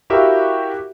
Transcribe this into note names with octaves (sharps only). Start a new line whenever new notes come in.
E4 F#4 G4 A#4 E5 F5